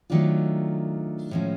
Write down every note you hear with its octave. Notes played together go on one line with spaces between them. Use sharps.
D#3 F#3 A3 D4 F4
A2 F3 G#3 C#4